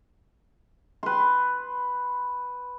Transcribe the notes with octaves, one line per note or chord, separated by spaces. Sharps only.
B4 C6